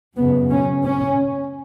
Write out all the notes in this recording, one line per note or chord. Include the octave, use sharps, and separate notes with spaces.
F#2 C#3 B3
C#4
C#4